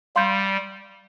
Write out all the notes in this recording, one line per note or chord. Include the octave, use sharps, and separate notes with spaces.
G3 F5 C6 G6